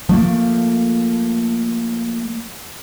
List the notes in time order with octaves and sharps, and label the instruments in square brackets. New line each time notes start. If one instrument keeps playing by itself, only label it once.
[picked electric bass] F3 A3 A#3